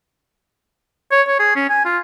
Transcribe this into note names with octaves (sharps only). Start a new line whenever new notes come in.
C#5
C#5
G#4
C#4
G#5
F4